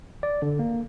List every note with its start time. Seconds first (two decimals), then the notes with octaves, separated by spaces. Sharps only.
0.23 D5
0.42 D3
0.59 A#3